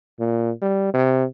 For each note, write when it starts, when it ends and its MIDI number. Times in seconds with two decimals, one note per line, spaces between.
0.20 0.51 46
0.62 0.92 55
0.94 1.24 48